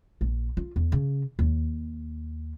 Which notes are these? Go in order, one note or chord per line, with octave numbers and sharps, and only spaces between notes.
A#1
F4
E2
C#3
D#2